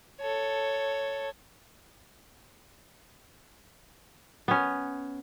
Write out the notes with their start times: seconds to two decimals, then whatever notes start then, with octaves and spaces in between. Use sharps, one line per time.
0.21 A4 C#5
4.48 B3 C#4